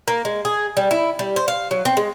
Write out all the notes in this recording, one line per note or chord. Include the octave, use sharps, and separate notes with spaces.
A#3
G#3
G#4
G3
E4
G3
C5
F5
F#3
C4
G#3